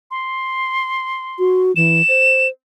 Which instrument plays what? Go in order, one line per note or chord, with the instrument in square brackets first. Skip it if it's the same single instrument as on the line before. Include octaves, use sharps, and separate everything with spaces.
[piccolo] C6
[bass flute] F#4
[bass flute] E3 [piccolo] E7
[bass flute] C5